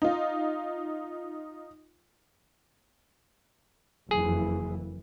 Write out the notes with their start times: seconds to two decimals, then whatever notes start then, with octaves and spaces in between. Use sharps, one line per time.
0.02 D#4 F4
4.11 F#1 F2 E3 G#4